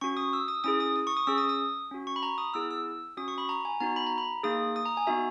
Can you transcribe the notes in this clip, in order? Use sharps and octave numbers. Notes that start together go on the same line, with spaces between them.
C#4 F#4 C#6
D#6
E6
D#6
C#4 E4 G#4 D#6
D#6
D#6
C#6
D#6
C#4 G#4 E6
D#6
D#6
C#4 F#4
C#6
B5
A#5
D#6
B3 E4 G#4 E6
E6
C#4 F#4 D#6
C#6
B5
A#5
G#5
B3 D#4 F#4 A#5
B5
A#5
B5
A#3 D#4 G#4 D#6
D#6
A#5
G#5
B3 D#4 F#4 E5